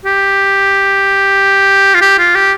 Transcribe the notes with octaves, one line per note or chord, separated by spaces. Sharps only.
G4
F4
G4
F4
G4